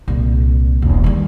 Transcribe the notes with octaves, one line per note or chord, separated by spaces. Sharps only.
C2 A#2
E1
D#3 G3